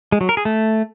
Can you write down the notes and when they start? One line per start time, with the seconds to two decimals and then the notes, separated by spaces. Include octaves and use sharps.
0.12 G#3
0.21 F#3
0.29 A#4
0.37 G#4
0.45 A3